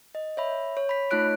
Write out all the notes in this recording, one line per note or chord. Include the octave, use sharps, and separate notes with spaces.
D#5
C#5 E5 B5
C#5
B5 B6
A3 D#4 F4 C#5 F#6 D7